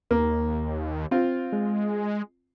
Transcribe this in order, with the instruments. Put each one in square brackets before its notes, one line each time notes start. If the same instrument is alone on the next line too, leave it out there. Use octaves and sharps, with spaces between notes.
[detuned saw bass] D#2 [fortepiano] A#3
[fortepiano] C4 F4
[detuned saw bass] G#3